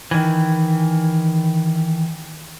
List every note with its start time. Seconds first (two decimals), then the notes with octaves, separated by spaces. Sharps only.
0.11 D#3 E3